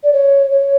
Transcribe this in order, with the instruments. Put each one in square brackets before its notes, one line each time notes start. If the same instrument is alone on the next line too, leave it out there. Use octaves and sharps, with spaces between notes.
[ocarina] D5
C#5
C#5